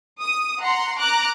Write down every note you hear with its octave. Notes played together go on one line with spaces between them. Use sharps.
D#6
F#5 A#5 C6
A#5 D6 F#6